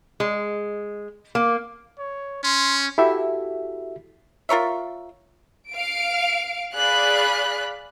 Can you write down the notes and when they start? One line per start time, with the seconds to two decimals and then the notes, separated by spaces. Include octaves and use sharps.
0.20 G#3
1.35 A#3
1.99 C#5
2.44 C#4 C6
2.98 E4 F#4 G4 A4 E5
4.49 F4 A#4 C#5 E5
5.71 F5 D7
6.74 G#4 D5 F5 B5 F#6